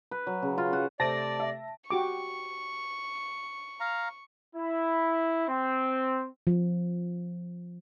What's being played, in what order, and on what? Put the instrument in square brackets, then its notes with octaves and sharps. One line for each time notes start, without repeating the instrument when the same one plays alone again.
[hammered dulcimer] B4
F#3
C#3
F4
F#4
[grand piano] C3 A3 D7 [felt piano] C5 [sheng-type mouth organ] D5 [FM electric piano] A5 A#6
[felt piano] E5
[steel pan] F#4 G4 D6 [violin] C#6
[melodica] F5 A#5
[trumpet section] E4
C4
[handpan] F3